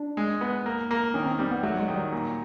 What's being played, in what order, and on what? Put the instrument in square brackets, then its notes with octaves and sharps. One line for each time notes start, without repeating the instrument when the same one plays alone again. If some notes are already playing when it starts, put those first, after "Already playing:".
Already playing: [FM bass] D4
[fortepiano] G#3
B3
A#3
A#3
[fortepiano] D#3 [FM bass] C#4
[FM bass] C4
[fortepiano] G3 [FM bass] C4
[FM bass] B3
[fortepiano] F#3 [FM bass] A3
[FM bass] G#3
[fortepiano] D#3
[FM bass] G3
[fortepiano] A#2